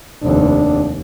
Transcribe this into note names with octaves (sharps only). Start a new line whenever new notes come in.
F1 D#2 D4